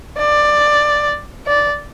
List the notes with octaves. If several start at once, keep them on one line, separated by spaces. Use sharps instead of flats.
D5
D5